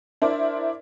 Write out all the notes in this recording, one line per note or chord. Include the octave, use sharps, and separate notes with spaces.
D4 E4 A#4 C5 D5